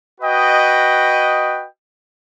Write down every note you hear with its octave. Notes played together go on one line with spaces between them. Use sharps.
F#4 B4 D#5 G5